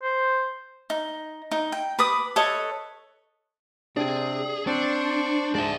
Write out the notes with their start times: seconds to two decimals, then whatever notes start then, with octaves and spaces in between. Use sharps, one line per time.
0.02 C5
0.90 D#4
1.51 D#4
1.72 G5
1.99 B4 B5 D6 D#6
2.36 A4 B4 C#5 D#5
3.97 C3 C4 D4 G#4
4.67 C4 D4 C5 D5 C#6
5.55 G#2 G#3 D5 E5 A5